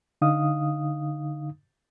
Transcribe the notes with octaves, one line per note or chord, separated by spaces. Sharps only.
D3 D#4 F5 D#6